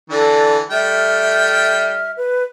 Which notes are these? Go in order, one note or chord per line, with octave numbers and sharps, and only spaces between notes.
D3 E3 A4 D5
G3 A3 E5 G5 F6
B4